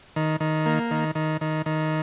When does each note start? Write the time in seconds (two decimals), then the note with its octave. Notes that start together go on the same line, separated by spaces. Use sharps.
0.16 D#3
0.40 D#3
0.66 A#3
0.91 D#3
1.15 D#3
1.41 D#3
1.66 D#3